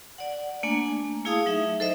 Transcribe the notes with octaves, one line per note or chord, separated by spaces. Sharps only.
D5 F#5
A3 A#3 D4 G#5
A3 E4 G#4 F5 A5 D#6
F#3 D#4 E5
A4 C5 D#5 E5